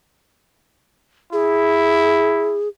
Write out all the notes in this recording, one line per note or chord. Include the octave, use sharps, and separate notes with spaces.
E4 G#4